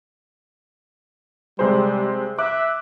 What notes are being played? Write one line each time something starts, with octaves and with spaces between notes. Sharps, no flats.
C3 G3 G#3 C5
E5 D6 F#6